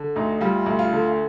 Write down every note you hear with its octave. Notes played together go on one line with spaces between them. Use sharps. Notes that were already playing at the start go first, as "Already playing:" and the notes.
Already playing: D3
D2 D#4
G3 F4
D2
F4
D3